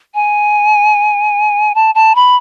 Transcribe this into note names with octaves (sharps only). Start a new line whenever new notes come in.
G#5
A5
A5
B5